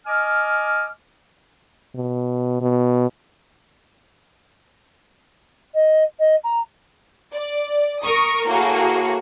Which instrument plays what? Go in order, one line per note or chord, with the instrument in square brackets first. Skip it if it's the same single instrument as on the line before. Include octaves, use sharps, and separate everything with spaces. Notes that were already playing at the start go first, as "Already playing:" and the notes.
[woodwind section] D#5 G#5 D6 F6
[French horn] B2
B2
[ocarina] D#5
D#5
A#5
[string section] D5
A#4 C#6 D#6
A2 A#3 F#4 G#4